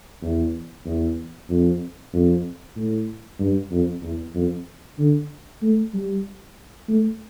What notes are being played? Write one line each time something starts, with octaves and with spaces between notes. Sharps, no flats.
E2
E2
F2
F2
A2
G2
F2
E2
F2
D3
A3
G3
A3